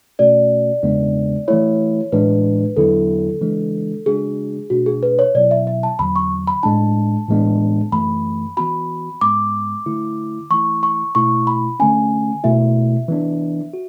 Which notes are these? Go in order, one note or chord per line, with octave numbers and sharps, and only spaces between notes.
B2 A3 C#4 F#4 D5
E2 C#3 G#3 B3 D4
E3 A3 E4 C#5
A2 E3 G#3 D4 B4
E2 D3 F#3 B3 E4 A4
C#3 E3 G#3 D4
C#3 G#3 D4 F#4 G#4
B2 A3 D4 F#4
G#4
B4
C#5
B2 F#3 B3 E4 D5
E5
E5
A5
E2 D3 F#3 B5
C#6
B5
A2 G#3 D4 A5
A2 E3 G#3 B3 D4
F#2 E3 A3 B5
E3 B3 F#4 B5
G#2 G#3 B3 D6
D3 A3 E4
E3 A3 E4 C#6
C#6
B2 A3 E4 C#6
B5
D3 A3 C#4 G#5
B2 A3 E4 E5
E3 B3 D4
F#4